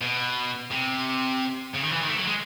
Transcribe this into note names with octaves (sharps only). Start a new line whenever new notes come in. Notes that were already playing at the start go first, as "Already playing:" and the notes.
B2
C3
C#3
D#3
E3
D#3
A3
F#3
G#3